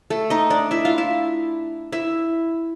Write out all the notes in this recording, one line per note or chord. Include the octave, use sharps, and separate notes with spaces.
A3 A4
D#4 D#5
D4 D5
E4 E5
F4 F5
E4 E5
E4 E5